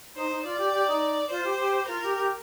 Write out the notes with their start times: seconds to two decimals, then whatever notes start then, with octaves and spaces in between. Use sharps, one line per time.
0.15 D#4 C5
0.29 D#4
0.44 F4 D5
0.58 G4
0.73 G4
0.87 D#4
1.30 F4 C5
1.44 G4
1.59 G4
1.87 F4 A#4
2.03 G4
2.17 G4